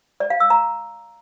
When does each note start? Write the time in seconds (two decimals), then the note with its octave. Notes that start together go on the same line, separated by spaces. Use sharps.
0.20 D5
0.30 F5
0.40 E6
0.50 A#5